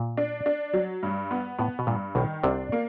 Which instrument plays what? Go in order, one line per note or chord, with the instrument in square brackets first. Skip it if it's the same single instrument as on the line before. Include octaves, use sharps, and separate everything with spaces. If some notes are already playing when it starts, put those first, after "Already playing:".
Already playing: [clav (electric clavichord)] A#2
[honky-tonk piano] D4
D4
F#3
G2
B3
[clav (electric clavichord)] A2 [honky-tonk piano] B3
[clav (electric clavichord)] B2
[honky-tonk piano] G2 [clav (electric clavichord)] A#2
[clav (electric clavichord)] B1 B2 [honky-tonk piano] D#3
[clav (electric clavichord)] C2 C3 [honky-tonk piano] D4
[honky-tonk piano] A#3